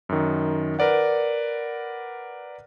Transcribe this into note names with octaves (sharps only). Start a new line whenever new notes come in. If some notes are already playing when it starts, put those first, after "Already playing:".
F#2 D#3
A#4 B4 D5 F#5